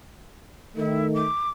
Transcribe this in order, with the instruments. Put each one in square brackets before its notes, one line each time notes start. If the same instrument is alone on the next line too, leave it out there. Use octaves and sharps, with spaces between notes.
[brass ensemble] D#3 A3 [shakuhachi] E4
[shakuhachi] D6